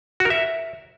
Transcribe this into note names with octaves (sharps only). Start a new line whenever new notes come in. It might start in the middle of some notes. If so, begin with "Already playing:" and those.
F#4
A#4
E5